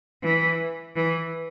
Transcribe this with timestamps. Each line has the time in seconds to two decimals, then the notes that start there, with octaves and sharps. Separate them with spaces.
0.23 E3
0.96 E3